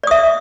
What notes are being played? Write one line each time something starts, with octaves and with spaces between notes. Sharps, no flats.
D5 E5 D#6